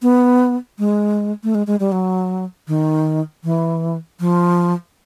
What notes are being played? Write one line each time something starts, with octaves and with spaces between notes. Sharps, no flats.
B3
G#3
A3
G#3
G#3
G3
F#3
D#3
E3
F3